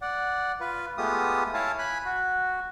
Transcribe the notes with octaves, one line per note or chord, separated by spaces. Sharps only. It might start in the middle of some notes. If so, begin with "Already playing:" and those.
D5 F#5
F4 B4
G#3 A3 B3 F4 G4 D#6
E4 C#5 F5 G#5 A5
G#5 B5 F#6
F#4